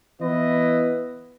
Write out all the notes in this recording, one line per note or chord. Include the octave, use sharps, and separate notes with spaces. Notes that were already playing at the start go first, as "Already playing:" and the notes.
E3 B3 E4 B4 D#5